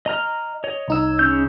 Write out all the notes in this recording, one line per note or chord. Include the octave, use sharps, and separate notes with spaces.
D#5 A#5 F6
C#5 D#5
C2 D#4 E6
C#3 C#4 G6